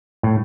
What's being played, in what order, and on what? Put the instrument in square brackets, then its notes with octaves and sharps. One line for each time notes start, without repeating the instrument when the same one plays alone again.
[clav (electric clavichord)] A2